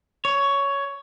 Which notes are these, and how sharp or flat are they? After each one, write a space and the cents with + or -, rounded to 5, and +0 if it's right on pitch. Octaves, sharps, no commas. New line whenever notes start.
C#5 +10